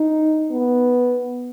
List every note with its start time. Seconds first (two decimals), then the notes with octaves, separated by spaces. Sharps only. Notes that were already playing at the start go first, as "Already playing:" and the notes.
Already playing: D#4
0.51 B3